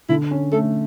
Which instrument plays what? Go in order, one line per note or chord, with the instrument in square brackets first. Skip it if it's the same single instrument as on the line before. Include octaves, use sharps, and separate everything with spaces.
[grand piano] D3 [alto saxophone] E4
[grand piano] C#4
[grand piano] A3 [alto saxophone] A4